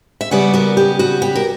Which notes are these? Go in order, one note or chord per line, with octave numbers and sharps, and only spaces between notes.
E5
C#3 G3 B3 D5 F#5
F#4 A#4
G4
F#4
G4
A#4